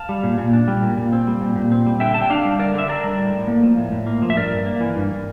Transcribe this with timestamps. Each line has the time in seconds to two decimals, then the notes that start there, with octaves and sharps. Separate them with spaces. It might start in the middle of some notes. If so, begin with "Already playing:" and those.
Already playing: F5 A5
0.09 G3
0.24 A#2
0.38 A#2
0.53 D4
0.68 G3
0.82 A#2
0.97 A#2
1.13 C4
1.27 G3
1.41 A#2
1.56 A#2
1.72 C4
1.86 G3
2.00 D3 E5 G5
2.14 D3 A5
2.22 G5
2.30 D4 D5 F5
2.45 G3
2.59 D3 A#4 D5
2.75 D3 E5
2.89 D4 A#4 D5
3.04 G3
3.18 A2
3.34 A2
3.48 A#3
3.63 F3
3.78 A2
3.92 A2
4.06 A#3
4.22 F3
4.30 E5
4.37 G2 A#4 D5
4.51 G2
4.66 A#3
4.81 E3
4.96 G2